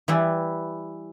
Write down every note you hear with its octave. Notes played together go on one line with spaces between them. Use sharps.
E3 G3 E4